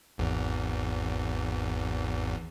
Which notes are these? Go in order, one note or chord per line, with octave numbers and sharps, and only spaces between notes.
G#1 E2